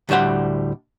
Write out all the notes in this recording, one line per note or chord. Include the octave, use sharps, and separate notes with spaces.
D2 A2 G3 C5 F#5